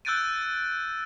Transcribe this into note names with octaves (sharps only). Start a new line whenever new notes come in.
E6 F#6 G6 A6 D7 D#7